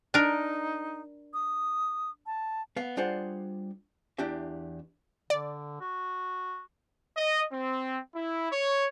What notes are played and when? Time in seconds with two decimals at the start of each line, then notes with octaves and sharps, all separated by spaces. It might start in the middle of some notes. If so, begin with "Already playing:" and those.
0.14 D4 D#4 A#4
1.34 D#6
2.26 A5
2.76 B3 F5
2.97 G3 D4 F4 G#4 C5 F#5
4.18 E2 D4 E4 G4 E5
5.30 D3 D5
5.81 F#4
7.17 D#5
7.52 C4
8.15 E4
8.52 C#5